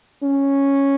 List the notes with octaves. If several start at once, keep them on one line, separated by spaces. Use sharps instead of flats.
C#4